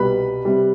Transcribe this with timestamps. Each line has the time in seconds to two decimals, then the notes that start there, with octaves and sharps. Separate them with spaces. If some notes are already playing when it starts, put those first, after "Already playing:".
Already playing: C2 B2 G3 B4 B5
0.45 C3 G3